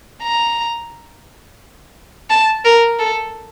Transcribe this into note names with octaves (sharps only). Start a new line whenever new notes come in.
A#5
A5
A#4
A4